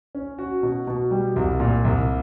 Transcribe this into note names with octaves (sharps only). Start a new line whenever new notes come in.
C#4
F#4
B2
B2
G3
C2
A#2
C2